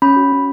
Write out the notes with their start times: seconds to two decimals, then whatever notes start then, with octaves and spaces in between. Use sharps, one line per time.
0.02 C#4 B5
0.16 F#4
0.32 C#4